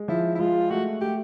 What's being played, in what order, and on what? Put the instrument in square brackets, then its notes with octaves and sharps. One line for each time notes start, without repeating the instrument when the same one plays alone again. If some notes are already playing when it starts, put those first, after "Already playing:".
Already playing: [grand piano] G#3
[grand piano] F3 [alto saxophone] E4
[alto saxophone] E4
[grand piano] G#3 [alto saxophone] F4
[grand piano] A3 [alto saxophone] F#4
[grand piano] A3 [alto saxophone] G4